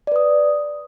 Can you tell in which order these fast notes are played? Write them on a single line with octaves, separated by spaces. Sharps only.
D5 B4 D#6